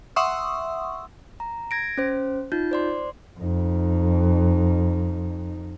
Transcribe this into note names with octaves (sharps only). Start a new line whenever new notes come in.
E5 F#5 C6 C#6 D#6 E6
A#5
G#6 A#6 D7
C#4 C5
D#4 F4 G6
C5 D5 C6
F2 D#4